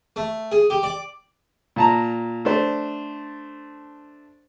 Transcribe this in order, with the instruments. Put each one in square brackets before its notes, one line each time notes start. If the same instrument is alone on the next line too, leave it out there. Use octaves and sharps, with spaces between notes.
[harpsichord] A3
G#4
G4
D5
[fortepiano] A#2 A5 A#5
A3 D4 C5